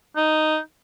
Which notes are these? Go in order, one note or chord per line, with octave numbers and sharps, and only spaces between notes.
D#4